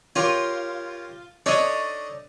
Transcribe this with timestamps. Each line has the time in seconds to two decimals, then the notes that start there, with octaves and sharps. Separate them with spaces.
0.16 F4 G4 A#4 C#5
1.46 D4 D#4 A4 C#5 D#5